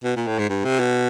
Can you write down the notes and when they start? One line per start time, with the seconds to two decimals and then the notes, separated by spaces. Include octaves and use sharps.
0.04 B2
0.16 A#2
0.27 A2
0.39 G#2
0.49 G2
0.65 C3
0.80 B2